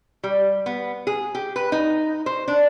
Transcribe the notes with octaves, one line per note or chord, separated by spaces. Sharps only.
G3
B3
G#4
G4
B4
D#4
C5
D4